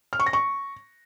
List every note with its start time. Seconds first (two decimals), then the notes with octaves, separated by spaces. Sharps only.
0.13 F6
0.20 C#6
0.26 A#6
0.33 C#6